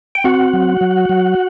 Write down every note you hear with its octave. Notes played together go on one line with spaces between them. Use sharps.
G5
C4 F#4 F#5
F#3
F#3
F#3